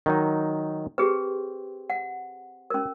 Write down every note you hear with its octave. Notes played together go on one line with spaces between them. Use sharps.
D#3 F#3 D#4
C4 G4 G#4 B4
F#5
C#4 A#4